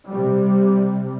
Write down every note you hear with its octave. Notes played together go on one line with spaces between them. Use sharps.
C3 G3